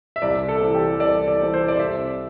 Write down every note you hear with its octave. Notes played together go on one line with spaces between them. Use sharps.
E5
C2 D5
A4
C3 E3 C4
G4
C2 D5
D5
C3 E3 C4
C5
D5
C2 E5